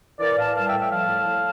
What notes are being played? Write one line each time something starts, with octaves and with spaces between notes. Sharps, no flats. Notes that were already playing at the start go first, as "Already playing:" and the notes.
E3 A#4 D5
A2 F5 A5
G3 F5 A5
E5 G5
A2
E5 G5
F3 F5 A5
A2
A2